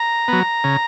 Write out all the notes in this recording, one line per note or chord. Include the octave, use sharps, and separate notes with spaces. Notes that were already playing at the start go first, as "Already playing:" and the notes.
Already playing: A#5
F#3 B3
C#3